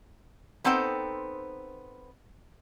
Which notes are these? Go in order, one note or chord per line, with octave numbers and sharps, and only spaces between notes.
B3 C4 D#4 A4 C5 G5